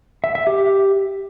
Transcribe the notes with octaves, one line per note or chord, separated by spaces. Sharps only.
E5
E5
G4